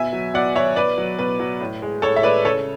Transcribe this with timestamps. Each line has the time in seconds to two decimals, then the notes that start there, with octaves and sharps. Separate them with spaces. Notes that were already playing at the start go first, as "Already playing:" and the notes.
Already playing: B2 E5 G#5
0.13 F#3
0.34 B2 D5 F#5
0.55 F#3 C#5 E5
0.76 B2 B4 D5
0.98 F#3
1.19 B2 B4
1.40 F#3
1.61 A2
1.82 G#3
2.02 A2 A4 C#5
2.16 E5
2.23 G#3 B4 D5
2.45 C#3 A4 C#5